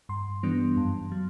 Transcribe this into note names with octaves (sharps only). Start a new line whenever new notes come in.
G2 C6
E3 G3 B3 D4
F#2
F#3